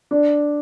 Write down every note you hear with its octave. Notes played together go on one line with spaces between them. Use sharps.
D4